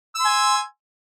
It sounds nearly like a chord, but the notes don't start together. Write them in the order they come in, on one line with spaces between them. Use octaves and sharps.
E6 C6 G#5